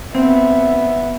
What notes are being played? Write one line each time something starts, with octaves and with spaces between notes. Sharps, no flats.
B3 C4 E5